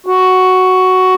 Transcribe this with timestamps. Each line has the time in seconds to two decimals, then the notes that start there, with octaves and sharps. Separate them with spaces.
0.06 F#4